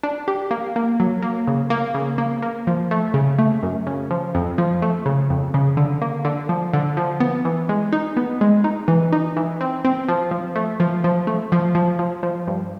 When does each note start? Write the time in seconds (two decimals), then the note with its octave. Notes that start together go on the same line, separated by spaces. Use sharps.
0.03 D4
0.28 G4
0.51 A#3
0.76 A#3
1.00 F#3
1.22 A#3
1.48 C#3
1.70 A#3
1.94 C#3
2.18 A#3
2.42 A#3
2.67 F3
2.91 A3
3.14 C#3
3.39 A3
3.63 F#2
3.87 C#3
4.11 F3
4.35 F2
4.58 F3
4.82 A3
5.06 C#3
5.30 F2
5.54 C#3
5.77 D3
6.02 A#3
6.25 D3
6.49 F3
6.73 D3
6.97 F3
7.20 B3
7.45 E3
7.69 G#3
7.93 D#4
8.17 B3
8.41 G#3
8.64 D#4
8.88 E3
9.13 D#4
9.37 E3
9.61 C4
9.85 C4
10.08 F3
10.31 F3
10.56 A3
10.80 F3
11.04 F3
11.27 A3
11.52 F3
11.75 F3
11.99 F3
12.23 F3
12.47 G2